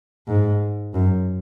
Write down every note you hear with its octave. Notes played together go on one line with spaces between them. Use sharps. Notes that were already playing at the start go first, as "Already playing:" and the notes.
G#2
F#2